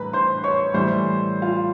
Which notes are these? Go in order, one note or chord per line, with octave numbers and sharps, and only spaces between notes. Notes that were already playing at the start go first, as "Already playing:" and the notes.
Already playing: A2 E3 G3 B4 A#5 B5
C5 C6
C#5 C#6
A2 E3 G3 C5 C6
F4 F5